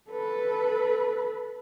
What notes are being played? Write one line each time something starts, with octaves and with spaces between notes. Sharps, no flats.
A4 B4